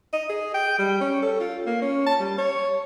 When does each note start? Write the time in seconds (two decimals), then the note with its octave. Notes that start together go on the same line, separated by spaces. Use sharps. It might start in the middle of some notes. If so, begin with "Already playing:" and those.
0.13 D#5
0.29 G#4
0.54 G5
0.78 G3
1.01 C#4
1.23 A4
1.40 F4
1.66 A#3
1.82 C#4
2.06 A5
2.20 G3
2.38 C#5